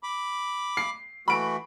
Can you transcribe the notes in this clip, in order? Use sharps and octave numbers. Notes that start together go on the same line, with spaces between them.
B5 D6
C7
E3 A3 F#4 B5 D7